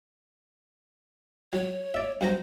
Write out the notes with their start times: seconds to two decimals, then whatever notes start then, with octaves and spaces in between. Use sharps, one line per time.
1.53 F#3 C#5
1.94 D5 E5
2.21 G2 F#3 C5 A#5